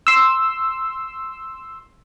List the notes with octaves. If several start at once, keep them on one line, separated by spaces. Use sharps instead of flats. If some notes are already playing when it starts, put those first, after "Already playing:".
C6 E6